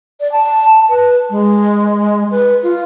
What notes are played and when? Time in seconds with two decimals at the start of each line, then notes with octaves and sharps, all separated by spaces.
0.20 D5
0.32 A5
0.90 B4
1.30 G#3
2.31 B4
2.63 F4